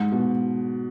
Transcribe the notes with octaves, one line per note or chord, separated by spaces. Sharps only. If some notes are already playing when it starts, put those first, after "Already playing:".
Already playing: G#2
B2